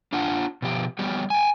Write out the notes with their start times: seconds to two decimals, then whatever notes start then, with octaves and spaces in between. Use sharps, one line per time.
0.13 D4 F4 F#5 A5
0.62 B2 F3 G4
0.99 G3 B3 F#4 G4
1.30 G5 G#5